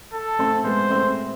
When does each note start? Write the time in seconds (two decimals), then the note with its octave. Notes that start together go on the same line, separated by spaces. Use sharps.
0.14 A4
0.39 A3 C4
0.64 G#3 B3 C5
0.90 A3 C4